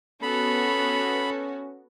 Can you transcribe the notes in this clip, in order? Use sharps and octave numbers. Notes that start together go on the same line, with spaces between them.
B3 C#4 F#4 A4 B5